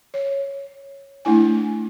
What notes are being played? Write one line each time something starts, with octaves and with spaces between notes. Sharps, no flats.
C#5
A3 D4 E4 G#5